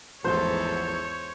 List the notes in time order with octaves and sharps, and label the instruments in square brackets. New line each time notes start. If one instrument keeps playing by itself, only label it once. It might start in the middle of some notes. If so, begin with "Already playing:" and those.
[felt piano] A1 F3 G6 [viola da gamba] E2 G#2 A4 [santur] C5 [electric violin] C#5